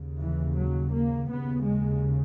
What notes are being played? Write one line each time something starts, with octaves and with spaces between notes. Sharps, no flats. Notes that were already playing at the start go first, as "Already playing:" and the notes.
Already playing: D#2 C#3
E3
F#3
A#3
D#2 C#3 B3
G#3